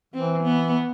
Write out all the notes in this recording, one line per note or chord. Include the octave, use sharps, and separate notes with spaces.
E3 C4
B3